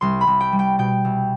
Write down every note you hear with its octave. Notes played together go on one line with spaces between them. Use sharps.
C2 C6
B5
C2
G5
G3
G5
B2 G5
C2